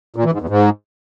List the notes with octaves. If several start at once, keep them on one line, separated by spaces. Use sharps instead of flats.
A#2
E3
G#2
E2
G#2